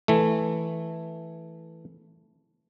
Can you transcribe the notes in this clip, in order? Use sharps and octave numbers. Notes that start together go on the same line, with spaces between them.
E3 A3